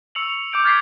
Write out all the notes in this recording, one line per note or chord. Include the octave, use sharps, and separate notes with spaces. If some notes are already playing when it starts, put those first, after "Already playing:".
C#6 E6 C#7 F7 F#7
F7
D6 E6 G6 D7 F#7
F6 G#6 A6 B6 C7 D7